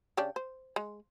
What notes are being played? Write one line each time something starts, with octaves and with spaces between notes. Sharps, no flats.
C#3 D4 G4
C5
G#3